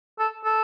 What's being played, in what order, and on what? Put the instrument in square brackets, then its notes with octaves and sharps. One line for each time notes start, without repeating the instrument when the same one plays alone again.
[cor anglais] A4
A4